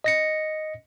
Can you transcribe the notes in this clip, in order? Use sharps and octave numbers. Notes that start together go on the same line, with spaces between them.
D#5 A#6 C#7